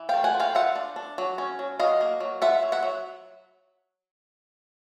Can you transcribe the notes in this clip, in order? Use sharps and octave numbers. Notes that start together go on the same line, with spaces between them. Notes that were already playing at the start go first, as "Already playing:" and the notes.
Already playing: E3
A3 F5 G5
F#5 G#5
F4
F5 G5
F4 E5 F#5
D4
D4
F#3
C#4
F#3
F#3 D#5 F5
A#3
F#3
F4 E5 F#5
F#3
E5 F#5
F#3